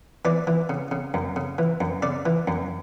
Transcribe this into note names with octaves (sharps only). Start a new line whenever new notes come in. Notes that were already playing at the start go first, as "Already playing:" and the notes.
E3 D5
E3
C#3
C#3
F#2
C#3
E3
F#2
C#3 D5
E3
F#2